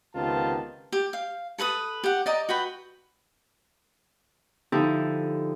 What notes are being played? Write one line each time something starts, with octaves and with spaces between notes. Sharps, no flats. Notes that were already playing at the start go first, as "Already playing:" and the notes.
C#2 C3 D#3 B3 F4 A5
G4
F5
A4 B4 A5 D#6
G4 F#5
D5 D#5 A#5
F#4 B4 G5 B5
D3 F3 D#4 E4 G4 A4